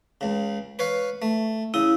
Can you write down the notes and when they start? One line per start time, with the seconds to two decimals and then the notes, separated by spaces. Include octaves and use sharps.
0.21 C#2 C#3
0.79 B4 C#5 F5
1.22 A3
1.74 C#3 E4 D#6